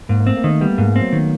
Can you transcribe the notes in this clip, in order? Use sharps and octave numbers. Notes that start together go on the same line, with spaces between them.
G#2 A#3
A#3
A3 C4
A#3
D#3 A3
G3 B3
G#2 A#3
C4
F#3
D#3